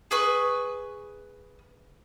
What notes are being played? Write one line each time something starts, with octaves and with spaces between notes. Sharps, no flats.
G#4 B4 C#6